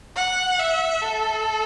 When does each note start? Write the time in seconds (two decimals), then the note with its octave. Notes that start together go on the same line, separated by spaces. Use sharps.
0.16 F#5
0.59 E5
1.02 A4